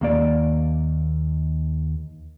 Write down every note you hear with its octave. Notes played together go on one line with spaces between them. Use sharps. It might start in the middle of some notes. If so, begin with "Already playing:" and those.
D#2 A#3 D5